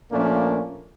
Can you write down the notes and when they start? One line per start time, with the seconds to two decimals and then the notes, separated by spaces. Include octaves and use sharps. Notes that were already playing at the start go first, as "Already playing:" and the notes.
0.11 A#2 F3 A3 A#3 C#4 D4